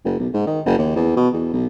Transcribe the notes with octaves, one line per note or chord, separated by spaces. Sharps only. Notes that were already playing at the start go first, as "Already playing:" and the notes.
F#1
B1
G#2
D#3
F#1
D#2
E2
B2
E2
B1